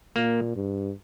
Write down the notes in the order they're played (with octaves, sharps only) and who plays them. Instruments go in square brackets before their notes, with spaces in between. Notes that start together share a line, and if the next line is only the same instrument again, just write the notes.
[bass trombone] A#2 [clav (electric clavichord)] A#3
[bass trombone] G2